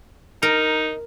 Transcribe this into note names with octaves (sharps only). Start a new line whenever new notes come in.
D#4 A#4